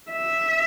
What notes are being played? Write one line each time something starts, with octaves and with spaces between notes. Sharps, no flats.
E5